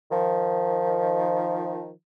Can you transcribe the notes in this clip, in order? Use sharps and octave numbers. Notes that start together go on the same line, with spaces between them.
D#3 F3